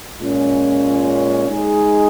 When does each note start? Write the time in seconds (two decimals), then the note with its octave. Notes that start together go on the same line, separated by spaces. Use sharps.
0.18 A#2 G#3 C#4 F4
1.48 G#3 D#4 G#4